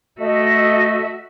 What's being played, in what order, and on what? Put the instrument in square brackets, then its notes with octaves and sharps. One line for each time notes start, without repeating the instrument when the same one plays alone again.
[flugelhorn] A3 [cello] F#4 E5 [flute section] D#5